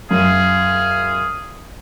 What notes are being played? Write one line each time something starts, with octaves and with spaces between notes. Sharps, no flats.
F#2 G#4 F5